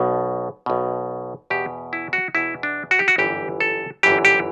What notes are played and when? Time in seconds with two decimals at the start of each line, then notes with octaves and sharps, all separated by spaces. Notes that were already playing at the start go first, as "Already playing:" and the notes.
Already playing: B1 B2
0.66 B1 B2
1.50 E2 B2 G4
1.93 E4
2.13 F#4
2.35 E2 B2 E4
2.63 D4
2.91 F#4
2.99 G4
3.08 F#4
3.18 G1 F#2 E3 G4
3.60 A4
4.03 G1 F#2 E3 G4
4.25 G4